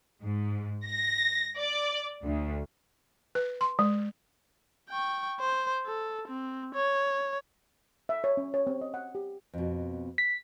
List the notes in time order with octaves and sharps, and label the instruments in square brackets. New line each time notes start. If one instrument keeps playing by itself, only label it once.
[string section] G#2
A#6
D5
D2
[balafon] B4
C6
G#3
[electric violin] G5 C#6
C5
A4
C4
C#5
[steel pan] E5
C#5
C#4
C#5
C4
D#5
F#5
G4
[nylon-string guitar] F2 B2
[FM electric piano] B6